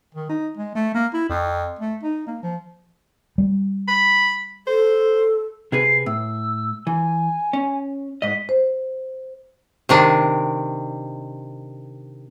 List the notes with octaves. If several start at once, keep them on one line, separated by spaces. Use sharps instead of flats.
D#3
D#4
G#3
A3
A#3
E4
F2
A3
D#4
A#3
F3
G3
B5
A4 C5
C3 G#4 B4 C7
A2 E6
E3 G#5
C#4
G#2 D#5 B6
C5
C3 D#3 D4